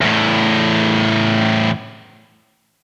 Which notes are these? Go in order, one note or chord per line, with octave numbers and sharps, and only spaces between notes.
E2 A2